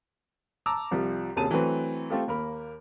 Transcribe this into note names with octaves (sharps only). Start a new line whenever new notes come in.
A5 A#5 D6 E6
C2 F3 G3
D#1 C2 F#2 G#4 A5 D#7
E3 F#3 A3 C4 B4
A3 C4 F4 G4 A4
D#2 A#3 A#4 B5